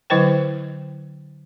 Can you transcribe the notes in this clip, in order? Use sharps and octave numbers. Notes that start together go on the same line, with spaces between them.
D3 F#3 E4 B4 C5 G5